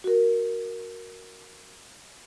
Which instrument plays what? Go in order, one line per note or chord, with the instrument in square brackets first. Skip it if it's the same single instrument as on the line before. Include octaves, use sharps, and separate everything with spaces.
[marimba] F#4 A#4